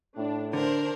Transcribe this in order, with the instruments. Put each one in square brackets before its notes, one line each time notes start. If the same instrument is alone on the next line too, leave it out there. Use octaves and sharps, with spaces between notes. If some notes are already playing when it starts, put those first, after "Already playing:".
[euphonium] A2 [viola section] D4
[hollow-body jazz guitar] D3 [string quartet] D4 A#4 [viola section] C5